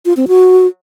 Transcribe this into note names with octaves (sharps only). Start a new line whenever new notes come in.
F4
C4
F#4